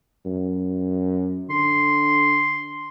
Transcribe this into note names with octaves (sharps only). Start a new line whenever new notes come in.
F#2
D3 C6